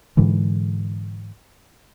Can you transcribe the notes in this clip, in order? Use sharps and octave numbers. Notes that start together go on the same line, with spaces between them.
G#2 D3 E3 G#3